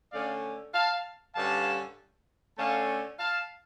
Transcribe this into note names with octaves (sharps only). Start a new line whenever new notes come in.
D3 A3 C#4 D5 F5
F5 A5
G2 D3 G3 C#4 F5 A5
D3 A3 C#4 F5 A5
F5 A5